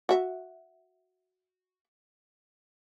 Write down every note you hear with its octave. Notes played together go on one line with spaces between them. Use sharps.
F#4 E5